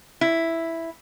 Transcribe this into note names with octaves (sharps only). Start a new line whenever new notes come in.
E4